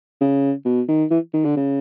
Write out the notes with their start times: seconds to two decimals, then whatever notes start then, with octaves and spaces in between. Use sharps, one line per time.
0.20 C#3
0.65 B2
0.88 D#3
1.11 E3
1.33 D#3
1.45 D3
1.56 C#3